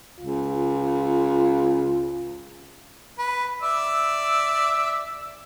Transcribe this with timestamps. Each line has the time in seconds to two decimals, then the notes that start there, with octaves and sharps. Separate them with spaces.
0.19 C#2 F4
3.18 B4
3.62 D5 E5 E6